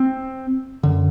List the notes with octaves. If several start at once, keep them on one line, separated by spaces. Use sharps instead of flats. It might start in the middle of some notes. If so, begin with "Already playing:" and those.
Already playing: C4
F#2 D3